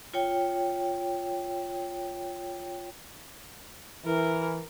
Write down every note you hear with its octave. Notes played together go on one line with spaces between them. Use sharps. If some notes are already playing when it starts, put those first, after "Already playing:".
F4 C#5 G5
E3 A#4